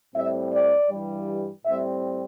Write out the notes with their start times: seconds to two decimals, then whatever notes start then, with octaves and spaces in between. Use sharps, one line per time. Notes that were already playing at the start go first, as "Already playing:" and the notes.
0.15 A2 G3 C4 E5
0.52 D5
0.90 G2 E3 G3
1.65 A2 G3 C4 E5